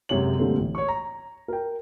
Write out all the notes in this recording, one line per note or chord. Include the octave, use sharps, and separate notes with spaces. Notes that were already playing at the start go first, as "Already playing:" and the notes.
F#2 C3 G#3 F#4 C#5 F#7
A#2 D3 G3 A3 A#3 C4
A1
C#5 C#6
A#5
A#4 G5